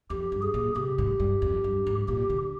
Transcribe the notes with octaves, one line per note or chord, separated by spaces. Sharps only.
F2 G4
G2
G#4
A#2
C3 G4
G#2
G2
F2
G2
G#2
A#2 G4
D3